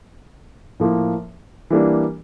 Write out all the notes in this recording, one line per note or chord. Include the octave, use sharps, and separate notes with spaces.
A2 F3 A#3
E3 G3 A#3 D4